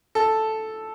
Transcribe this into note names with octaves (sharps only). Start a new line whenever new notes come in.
A4